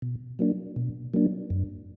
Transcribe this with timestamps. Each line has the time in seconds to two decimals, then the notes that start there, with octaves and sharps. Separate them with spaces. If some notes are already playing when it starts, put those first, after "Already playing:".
0.02 B2
0.39 F#3 A#3 D4
0.76 B2
1.14 F#3 A#3 D4
1.50 F#2